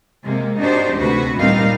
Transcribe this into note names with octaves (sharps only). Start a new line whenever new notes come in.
C3 G#3 A#3
D4 D#4 F#4 G4 C5
D2 C3 F#4 B4
A#2 G3 C4 D#4 A#4 F5